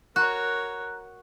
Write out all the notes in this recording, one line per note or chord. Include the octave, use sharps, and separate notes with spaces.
F#4 A#4 C#5 A#5 F#6